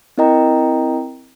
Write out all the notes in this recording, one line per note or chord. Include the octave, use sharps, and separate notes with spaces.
C4 E4 A#4 D#5 G5 A#5